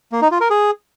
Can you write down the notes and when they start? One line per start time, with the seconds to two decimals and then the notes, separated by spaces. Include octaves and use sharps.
0.12 A#3
0.22 D#4
0.31 F4
0.41 A#4
0.50 G#4